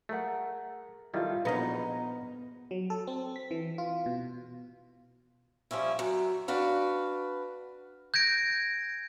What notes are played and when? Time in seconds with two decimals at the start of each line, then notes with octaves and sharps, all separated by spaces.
0.09 A3 G#4 A#4 F#5
1.14 B2 D#3 G3 E4 F4 A4
1.45 A#1 B3 D#4 A#4 C#5 D#5 A#5
1.58 F#4 B5
1.75 A#5
2.71 F#3
2.90 A4
3.07 C4
3.36 B6
3.51 E3
3.78 F4
4.06 B2
5.71 F3 G3 C#4 E4
5.99 F#2
6.48 D4 F#4 B4 F5
8.14 G6 G#6 A#6 D7